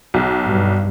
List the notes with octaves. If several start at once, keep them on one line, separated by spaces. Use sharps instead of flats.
B1
G2